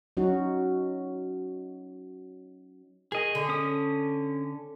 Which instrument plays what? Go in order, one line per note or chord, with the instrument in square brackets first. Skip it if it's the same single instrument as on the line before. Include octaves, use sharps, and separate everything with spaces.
[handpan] F#3 C#4 D#4 F#4
[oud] D#3 [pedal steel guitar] G#4 D#5
[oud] D3
[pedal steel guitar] C#4 D#6